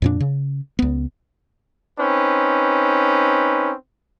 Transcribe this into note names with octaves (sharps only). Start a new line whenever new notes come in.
F2 A#2 D4
C#3
C#2 B3
C4 C#4 D#4 B4